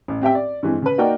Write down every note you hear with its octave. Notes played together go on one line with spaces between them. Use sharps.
A1
C4 G4 E5 G5
D5
G2 E3 G#3 C4
C#3 B4
A#3 D#4 F#4 A#4 D5 G5